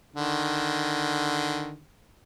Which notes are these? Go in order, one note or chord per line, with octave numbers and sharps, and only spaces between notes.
D3 D#3